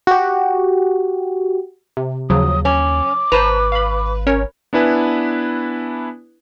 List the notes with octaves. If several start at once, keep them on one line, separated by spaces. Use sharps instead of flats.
F#4 G4
C3
D#2 C#3 F3 F#3 D#6
C#4 D6
G#1 B4 C5 A5 A#5
F5 B5
C#4 A#4 C#5
B3 D4 E4 B4 G#5